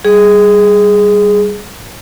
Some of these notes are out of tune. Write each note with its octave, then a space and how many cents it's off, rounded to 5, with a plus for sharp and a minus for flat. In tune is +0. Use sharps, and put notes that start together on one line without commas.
G3 +0 G#4 +0